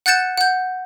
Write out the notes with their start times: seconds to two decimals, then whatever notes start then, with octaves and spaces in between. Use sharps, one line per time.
0.06 F#5 F#6 G6 A6 C#7 E7
0.37 F#5 G6